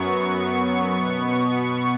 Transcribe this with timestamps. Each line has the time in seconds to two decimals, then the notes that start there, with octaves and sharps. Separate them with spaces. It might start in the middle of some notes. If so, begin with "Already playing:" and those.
Already playing: F#2 F#3 B3 C#6
0.15 C#6
0.94 B2 B3